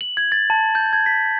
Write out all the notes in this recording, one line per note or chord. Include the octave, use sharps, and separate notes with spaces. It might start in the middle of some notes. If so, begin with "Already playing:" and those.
F#7
G#6
A6
A5
G6
G#6
B6